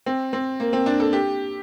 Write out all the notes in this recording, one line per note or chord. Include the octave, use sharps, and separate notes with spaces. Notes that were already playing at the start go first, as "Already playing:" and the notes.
C4
C4
A#3
C4
D4
A4
G4